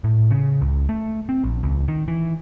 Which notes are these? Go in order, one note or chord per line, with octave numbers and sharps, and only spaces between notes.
A2
C#3
C#2
A3
C4
A#1
C#2
D#3
E3